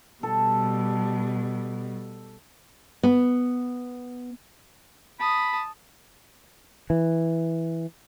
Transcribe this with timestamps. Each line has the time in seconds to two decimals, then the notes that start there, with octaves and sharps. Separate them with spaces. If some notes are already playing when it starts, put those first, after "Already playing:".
0.23 B2 G3 A4
3.03 B3
5.20 A5 B5 D#6
6.90 E3